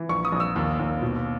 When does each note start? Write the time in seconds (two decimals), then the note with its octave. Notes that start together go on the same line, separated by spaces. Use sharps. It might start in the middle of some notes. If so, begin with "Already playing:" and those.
Already playing: E3
0.09 A#1 C#6
0.25 D#6
0.32 A#1
0.40 E6
0.56 D#2
0.79 D#2
1.02 B2